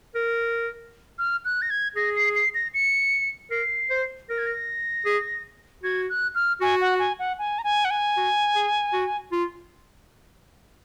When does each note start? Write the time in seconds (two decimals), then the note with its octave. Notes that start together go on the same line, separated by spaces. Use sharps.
0.15 A#4
1.19 F6
1.45 F#6
1.62 A#6
1.70 G#6
1.96 G#4 A#6
2.16 C7
2.35 C7
2.55 A#6
2.74 C#7
3.51 A#4 C7
3.90 C5
4.29 A#4 A#6
4.38 G#6
4.46 A#6
5.06 G#4
5.83 F#4 G#6
6.09 F#6
6.35 F6
6.61 F#4 G#5
6.81 F#5
6.99 G#5
7.19 F#5
7.38 G#5
7.59 A#5
7.64 G#5
7.85 F#5
7.91 G#5
8.17 F#4
8.55 G#4
8.93 F#4
9.32 F4